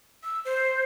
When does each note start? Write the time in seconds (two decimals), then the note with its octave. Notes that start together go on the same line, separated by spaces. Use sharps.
0.23 E6
0.45 C5